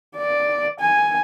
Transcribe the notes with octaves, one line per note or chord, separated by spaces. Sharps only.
D5
G#5